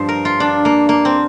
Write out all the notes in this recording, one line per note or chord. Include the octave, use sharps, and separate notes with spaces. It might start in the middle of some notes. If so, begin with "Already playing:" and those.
Already playing: G2 F3 C5
A#4
F4
D4
A#3
A#3
C4